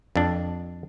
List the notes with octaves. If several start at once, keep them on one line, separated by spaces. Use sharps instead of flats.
F2 D4